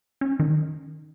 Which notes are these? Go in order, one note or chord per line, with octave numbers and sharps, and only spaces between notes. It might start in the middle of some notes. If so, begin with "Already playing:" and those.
C#4
D#3